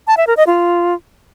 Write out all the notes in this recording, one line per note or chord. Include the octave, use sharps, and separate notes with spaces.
A5
E5
A#4
D#5
F4